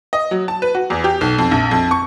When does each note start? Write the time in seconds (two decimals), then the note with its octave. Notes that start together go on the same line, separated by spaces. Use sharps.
0.13 D#5
0.31 F#3
0.48 A5
0.62 B4
0.75 F#4
0.90 E2
1.04 G4
1.21 B1
1.38 F2
1.51 A#1
1.71 F2
1.91 C#6